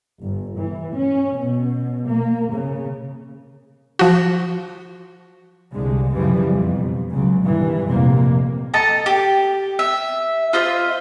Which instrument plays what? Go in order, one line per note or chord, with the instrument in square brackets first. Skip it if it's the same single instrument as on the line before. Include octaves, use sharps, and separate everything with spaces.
[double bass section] G1
E3
C#4
B2
A#3
C#3
[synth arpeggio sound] F3 F#4
[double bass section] C2 D3 G#3
F#2 C#3 E3 F3 G3
F2 B2
C#2 C#3 F#3
G2 B2 D#3 E3
F1 A#1 F2 A2 C3 A#3
[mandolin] A4 D#5 A5 A#5
G4
E5
F4 C5 D#5 E5